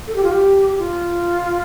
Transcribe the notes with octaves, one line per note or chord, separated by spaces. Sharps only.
A4
G4
F4
G4
F4